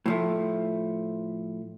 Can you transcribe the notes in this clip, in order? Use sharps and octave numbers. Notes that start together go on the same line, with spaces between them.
A2 F3 A3